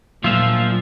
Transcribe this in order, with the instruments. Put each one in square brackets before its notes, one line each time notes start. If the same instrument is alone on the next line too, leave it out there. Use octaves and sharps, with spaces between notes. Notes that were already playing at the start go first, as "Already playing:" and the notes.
[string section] A#2 [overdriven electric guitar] F3 [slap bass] F#3 A3 D4 [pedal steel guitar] F4 E5